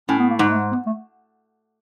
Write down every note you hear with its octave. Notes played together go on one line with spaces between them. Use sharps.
A2 C#4
B3
A#3
G#2 G#3
A3
B3
A3